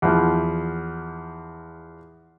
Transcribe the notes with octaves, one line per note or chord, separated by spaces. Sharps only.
E2 F3